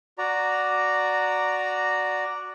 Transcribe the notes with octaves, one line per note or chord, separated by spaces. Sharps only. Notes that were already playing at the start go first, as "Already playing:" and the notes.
F#4 D5 A#5